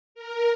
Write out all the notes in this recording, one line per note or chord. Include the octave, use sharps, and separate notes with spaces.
A#4